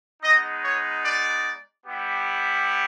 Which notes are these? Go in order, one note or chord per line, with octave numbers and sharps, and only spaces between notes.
G#3 B3 D#4 D#5
C#5
D5
G3 B3 E4 G4